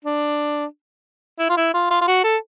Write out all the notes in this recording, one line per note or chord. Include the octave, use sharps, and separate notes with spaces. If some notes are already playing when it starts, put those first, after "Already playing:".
D4
E4
F4
E4
F4
F4
F4
F#4
A4